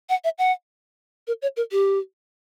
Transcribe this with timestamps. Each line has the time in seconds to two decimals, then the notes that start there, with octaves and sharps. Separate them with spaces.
0.09 F#5
0.24 E5
0.38 F#5
1.27 A#4
1.42 C#5
1.57 A#4
1.72 G4